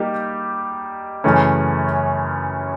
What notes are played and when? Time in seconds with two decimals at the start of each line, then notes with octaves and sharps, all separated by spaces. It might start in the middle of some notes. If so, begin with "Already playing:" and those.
Already playing: G3 A#3 D#4 G4
1.24 F#2 C#3 E3 A3 C#4